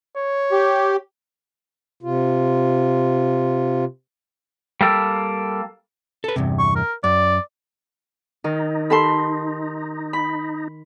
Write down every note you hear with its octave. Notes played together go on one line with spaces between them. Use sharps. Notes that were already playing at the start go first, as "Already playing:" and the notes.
C#5
G4
C3 F4
G3 A#3 A4
A4 B4
E2 G2 C3
C#6
A#4
F#2 D5
D#3 D#4
G4 A4 A5 B5 C6
B5